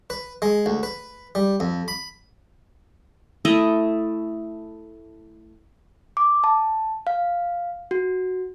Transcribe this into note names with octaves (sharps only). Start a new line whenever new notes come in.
B4
G#3
D2
B4
G3
F2
B5
A3 E4 D#5
D6
A5
F5
F#4